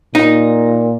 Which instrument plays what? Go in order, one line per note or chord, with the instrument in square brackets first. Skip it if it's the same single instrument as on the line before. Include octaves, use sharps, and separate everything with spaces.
[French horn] A#2 [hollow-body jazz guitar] D#4